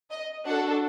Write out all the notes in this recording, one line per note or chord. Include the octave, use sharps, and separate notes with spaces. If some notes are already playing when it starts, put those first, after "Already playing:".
D#5
D4 F#4 A4 F#5